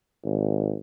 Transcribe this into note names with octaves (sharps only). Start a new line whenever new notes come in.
G#1